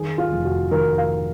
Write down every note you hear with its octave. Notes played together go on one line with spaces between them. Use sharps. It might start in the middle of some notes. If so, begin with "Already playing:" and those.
Already playing: D#3 G#4
F4
F1
F#4
D#3 A#4
F5